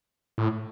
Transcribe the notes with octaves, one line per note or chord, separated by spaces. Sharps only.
A2